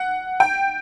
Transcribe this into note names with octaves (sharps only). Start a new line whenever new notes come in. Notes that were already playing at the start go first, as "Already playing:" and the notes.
Already playing: F#5
G5